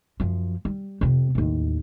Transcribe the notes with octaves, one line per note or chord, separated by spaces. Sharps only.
F#2 F3
G3
F2 C3
A1 D#2